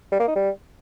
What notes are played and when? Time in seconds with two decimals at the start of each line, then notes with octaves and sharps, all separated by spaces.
0.12 G3
0.20 A#3
0.28 D#4
0.35 G3